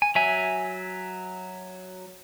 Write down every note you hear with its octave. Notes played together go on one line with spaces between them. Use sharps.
G#5
F#3 E5 G#5